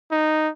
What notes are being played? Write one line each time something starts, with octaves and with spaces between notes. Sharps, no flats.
D#4